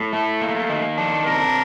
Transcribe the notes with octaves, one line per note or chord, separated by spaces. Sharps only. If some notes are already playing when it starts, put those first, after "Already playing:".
Already playing: A2
A3
A#3
D#3
D4
C3 A#4